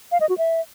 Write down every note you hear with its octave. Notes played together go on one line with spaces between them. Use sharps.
F5
D#5
F#4
E5